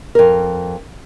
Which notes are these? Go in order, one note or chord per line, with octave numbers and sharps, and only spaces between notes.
F2 A#4